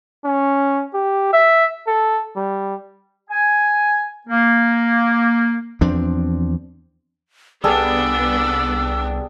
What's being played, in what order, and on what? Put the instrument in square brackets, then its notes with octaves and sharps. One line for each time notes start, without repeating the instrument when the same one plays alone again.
[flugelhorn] C#4
G4
E5
A4
G3
[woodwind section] G#5
A#3
[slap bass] E2 F3 C4 D4
[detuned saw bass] C2 [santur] G3 G#4 A4 [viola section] B3 D4 [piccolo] E6